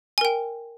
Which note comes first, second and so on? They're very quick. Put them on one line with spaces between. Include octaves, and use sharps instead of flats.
G#5 A#4 G5